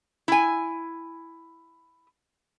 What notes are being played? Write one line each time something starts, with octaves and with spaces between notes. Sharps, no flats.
E4 G#5